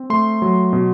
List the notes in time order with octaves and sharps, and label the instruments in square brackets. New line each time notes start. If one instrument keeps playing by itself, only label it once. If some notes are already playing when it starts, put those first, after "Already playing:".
Already playing: [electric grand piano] C4
A3 C6
F#3
B2